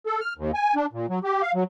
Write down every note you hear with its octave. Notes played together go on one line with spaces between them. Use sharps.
A4
F6
D#2
G#5
D4
A#2
F#3
G4
F5
F#3